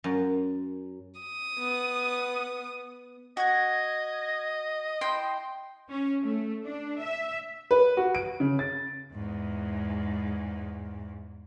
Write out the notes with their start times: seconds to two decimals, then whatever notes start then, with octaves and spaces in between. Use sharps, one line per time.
0.04 F#2
1.20 D#6
1.58 B3
3.37 F#4 D#5 G#6 A#6
5.01 E4 G5 C6
5.89 C#4
6.21 A3
6.65 D4
7.00 E5
7.71 B4
7.97 F#4
8.15 D7
8.40 C#3
8.59 A6
9.13 E2 G#2